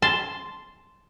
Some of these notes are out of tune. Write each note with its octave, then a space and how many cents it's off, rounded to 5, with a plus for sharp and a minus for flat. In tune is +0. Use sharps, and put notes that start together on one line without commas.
A5 +0 C6 -5